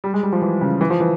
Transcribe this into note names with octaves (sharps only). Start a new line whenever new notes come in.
G3
G#3
G3
F3
E3
C#3
E3
F3
E3